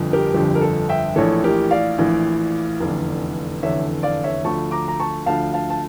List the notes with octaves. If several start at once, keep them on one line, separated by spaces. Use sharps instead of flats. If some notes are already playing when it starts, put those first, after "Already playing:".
Already playing: G1 F2 D3 F3
G4 A#4
G1 F2 D3 F3 G4
A#4
A4
E5 G5
A#1 A2 E3 A4 C#5
G4 A#4
D5 F5
A#1 A2 E3
F1 E2 D3
F1 E2 D3 C#5 E5
D5 F5
C#5 E5
D2 D3 F3 A5 C#6
A#5 D6
A#5
A5 C#6
D2 D3 F3 F5 A5
F5 A5
A5